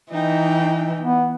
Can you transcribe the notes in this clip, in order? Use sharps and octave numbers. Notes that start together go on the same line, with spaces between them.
E3 D#4 G5
B3